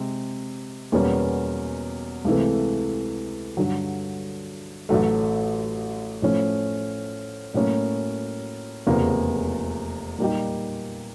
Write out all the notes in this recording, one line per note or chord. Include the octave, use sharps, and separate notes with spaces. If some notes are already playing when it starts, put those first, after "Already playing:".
Already playing: C3 G#3 C4
E2 B2 G3 A#3 C#4
C#2 C3 E3 A3
G2 D3 F#3
A1 A2 F#3 A3
A2 F3 A3 C#4
A2 F#3 A#3 C#4
F1 E2 C#3 F3 A#3
A#2 G3 A#3 D#4 G4